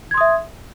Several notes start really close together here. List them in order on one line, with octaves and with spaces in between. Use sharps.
G#6 C6 D#6 E5